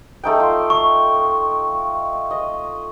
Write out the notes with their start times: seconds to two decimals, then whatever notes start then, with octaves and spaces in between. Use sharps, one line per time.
0.24 A3 D#4 G5
0.40 F4
0.70 C#6
2.31 D#5